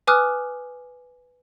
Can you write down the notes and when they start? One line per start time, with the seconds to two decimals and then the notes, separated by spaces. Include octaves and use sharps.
0.07 B4 G#5 D6 D#6 F6 F#6